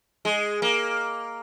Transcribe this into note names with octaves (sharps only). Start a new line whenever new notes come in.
G#3
A#3